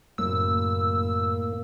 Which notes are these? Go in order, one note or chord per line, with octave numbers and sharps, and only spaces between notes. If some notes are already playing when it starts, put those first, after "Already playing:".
F#1 A2 A#3 E6